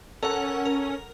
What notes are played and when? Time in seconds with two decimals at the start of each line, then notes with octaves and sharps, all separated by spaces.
0.23 C#4 A4 A#4 F#5
0.65 A#4